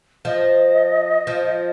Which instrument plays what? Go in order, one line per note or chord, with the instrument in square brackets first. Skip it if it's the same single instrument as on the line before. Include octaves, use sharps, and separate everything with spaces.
[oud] F3 [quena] D#5
[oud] F3